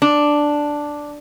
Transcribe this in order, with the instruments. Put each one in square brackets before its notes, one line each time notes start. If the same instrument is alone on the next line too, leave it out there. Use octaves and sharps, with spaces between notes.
[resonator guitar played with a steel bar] D4